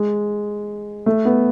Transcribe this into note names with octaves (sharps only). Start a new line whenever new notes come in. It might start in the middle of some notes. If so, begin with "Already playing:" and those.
Already playing: G#3
A3
B3